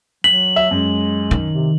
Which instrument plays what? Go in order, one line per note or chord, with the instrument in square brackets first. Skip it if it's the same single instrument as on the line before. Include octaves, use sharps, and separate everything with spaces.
[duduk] F#3 [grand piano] B6 [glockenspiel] F#7
[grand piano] E5
[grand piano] F#2 [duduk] G#3
[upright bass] D#3
[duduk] C3